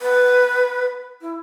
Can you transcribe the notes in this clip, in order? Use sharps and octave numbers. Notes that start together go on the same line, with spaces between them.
B4
E4